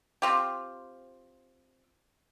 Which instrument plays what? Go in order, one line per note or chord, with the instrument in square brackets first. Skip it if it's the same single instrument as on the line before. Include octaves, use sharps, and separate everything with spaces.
[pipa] C4 F4 G4